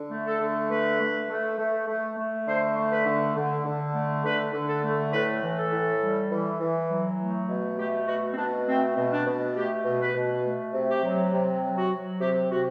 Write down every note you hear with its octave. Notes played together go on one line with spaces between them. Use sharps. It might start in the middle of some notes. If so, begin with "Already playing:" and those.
Already playing: D3
A3
A4
D3
A3 B4
A3
A3
A3
A3
A3
D3 C5
A3
B4
D3
D3
D3
A3
D3 B4
D3
A4
A3
A2 B4
E3
A4
A2
G3
E3
E3
F#3
A3
B2
A3 G4
B2 F#4
C4
B2 D4
A3 C4
B2
D4
B2
A3 G4
B2
B4
B2
A3
C3
G4
F#3
C3
F#3
F#4
F#3
C3 G4
C3 F#4